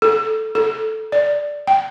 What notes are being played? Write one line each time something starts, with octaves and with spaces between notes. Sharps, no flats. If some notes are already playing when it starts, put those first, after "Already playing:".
A4
A4
D5
G5